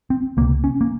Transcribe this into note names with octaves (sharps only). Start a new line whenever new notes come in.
C4
C#2 C3 A#3
C#4
A#3